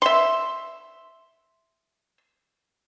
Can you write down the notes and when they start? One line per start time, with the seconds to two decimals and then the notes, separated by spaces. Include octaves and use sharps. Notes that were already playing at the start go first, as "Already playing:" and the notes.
0.02 E5 C6